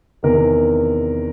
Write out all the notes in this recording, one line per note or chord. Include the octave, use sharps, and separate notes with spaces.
E2 C3 D#3 A#4